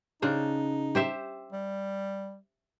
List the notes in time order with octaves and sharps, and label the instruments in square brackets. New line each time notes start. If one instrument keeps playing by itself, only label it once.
[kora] C#3 D4 C5 [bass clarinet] D#4
[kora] G4 C5 E5
[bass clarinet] G3